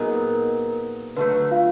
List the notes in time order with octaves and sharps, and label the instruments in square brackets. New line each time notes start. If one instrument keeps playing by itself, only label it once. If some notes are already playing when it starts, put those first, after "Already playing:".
Already playing: [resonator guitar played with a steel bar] A#2 F#3 B3 D#4 G#4 [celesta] A#4
[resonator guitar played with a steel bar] D3 F#3 A3 [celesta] B4
[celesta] F4 F5